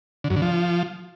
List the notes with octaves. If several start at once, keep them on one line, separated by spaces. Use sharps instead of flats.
D3
F#2
D3
F3